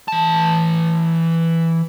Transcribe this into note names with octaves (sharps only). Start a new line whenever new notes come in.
E3 A5